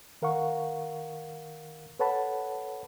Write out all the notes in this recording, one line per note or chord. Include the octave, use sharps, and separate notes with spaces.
D#3 A#4 F5 F#5 C#6
A4 B4 C#5 F#5 A5 B5